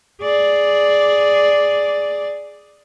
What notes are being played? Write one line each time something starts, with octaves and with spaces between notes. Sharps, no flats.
G#4 D5